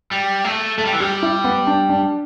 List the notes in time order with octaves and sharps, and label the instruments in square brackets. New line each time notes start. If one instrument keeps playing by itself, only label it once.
[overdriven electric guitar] G3
A3
[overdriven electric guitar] A3 [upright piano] A4
[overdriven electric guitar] G3
E3
[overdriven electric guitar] G3 [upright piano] G4
[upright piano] E4
B3
D4
D4